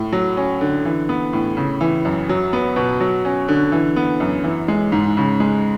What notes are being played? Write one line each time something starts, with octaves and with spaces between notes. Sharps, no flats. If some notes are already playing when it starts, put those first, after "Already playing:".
Already playing: A2
F#3
C#4
D3
E3
B3
A2
C#3
E3
F#2
F#3
B3
B2
F#3
C#4
D3
E3
B3
F#2
E3
G#3
G#2
C#3
G#3